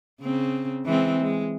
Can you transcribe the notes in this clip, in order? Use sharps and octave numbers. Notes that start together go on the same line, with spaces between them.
C#3 C4
E3 G#3 C4
G#3